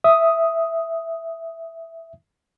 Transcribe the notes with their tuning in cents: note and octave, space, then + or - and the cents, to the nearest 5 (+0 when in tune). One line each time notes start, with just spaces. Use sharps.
E5 +0 D#6 +5